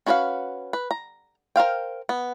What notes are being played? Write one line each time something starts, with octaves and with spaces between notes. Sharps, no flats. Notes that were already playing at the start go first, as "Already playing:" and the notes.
C#4 F#4 B4 D5 F5
B4
A#5
A#4 C5 F5 G5
B3